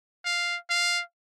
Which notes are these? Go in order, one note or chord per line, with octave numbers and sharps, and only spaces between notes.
F5
F5